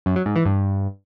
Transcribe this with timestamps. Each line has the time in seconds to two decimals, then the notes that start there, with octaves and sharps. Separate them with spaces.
0.06 F#2
0.16 F#3
0.26 G#2
0.36 E3
0.45 G2